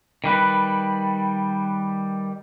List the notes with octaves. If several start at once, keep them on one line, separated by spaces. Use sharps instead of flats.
D#3 G3 B4